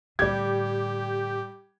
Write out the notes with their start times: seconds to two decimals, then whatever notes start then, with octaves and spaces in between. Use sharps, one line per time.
0.19 A2 D3 G3 G4 G#6